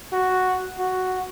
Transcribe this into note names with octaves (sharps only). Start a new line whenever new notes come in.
F#4
F#4